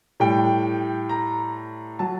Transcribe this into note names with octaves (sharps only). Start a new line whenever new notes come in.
A2 G3 G5
A#5
F#3 A5